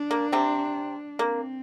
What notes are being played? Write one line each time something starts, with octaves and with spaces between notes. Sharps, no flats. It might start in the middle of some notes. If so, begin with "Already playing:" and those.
Already playing: D4
A#3
C3 C4
A#3 C4